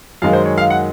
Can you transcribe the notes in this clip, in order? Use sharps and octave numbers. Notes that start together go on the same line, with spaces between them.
F#2 D#3 G#3 F5
C5
C#5
F5
F#5